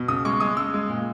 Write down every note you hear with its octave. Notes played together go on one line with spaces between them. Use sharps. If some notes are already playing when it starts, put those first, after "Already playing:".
Already playing: B2
C#3 D#6
G#3 C#6
G#3 D#6
C#3 E6
G#3
A#2